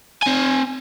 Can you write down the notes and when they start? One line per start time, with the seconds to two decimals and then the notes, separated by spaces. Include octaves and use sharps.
0.23 C4 G#5